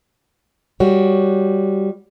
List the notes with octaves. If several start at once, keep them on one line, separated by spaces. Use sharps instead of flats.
G3 F#4 C#5